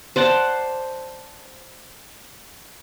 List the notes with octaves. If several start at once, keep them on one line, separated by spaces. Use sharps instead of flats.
C5 D5 F#5 A5